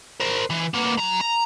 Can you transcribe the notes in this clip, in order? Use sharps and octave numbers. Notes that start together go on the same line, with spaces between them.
A#4 C5
E3
A#3 B3
F#3 A#5
A#5